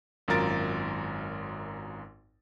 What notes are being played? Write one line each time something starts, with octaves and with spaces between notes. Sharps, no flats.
G#1 F#2 F4 A#4 A6 D7